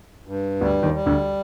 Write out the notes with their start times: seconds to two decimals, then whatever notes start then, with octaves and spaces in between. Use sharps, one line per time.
0.27 G2
0.61 D2 D3 G3
0.83 D#2 D#3
0.94 G3
1.06 D2 D3